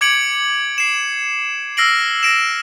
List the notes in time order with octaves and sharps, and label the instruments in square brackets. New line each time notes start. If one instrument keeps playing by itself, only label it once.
[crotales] D6 G#6 C#7 D7 F#7
C7 E7
E6 F6 A#6 C7 D7 F#7
A#6 D7 E7